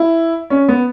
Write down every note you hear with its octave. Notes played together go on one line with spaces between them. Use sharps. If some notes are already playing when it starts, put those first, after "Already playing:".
Already playing: E4
C#4
B3